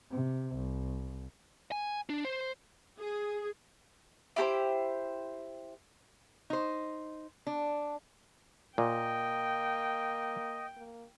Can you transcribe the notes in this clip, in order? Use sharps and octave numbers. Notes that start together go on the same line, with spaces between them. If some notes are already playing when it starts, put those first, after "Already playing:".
C3
C2
G#5
D4
C5
G#4
E4 G4 A4 C5
D#4 C5
D4
A#2 A#3 D#5 G5
A#3